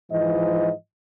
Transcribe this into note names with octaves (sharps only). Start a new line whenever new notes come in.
G#2 E3 F3 D#5